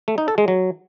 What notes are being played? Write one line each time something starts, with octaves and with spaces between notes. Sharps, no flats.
A3
D#4
A4
G#3
F#3